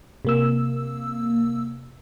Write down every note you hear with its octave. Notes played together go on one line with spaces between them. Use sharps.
C3 A#3 E6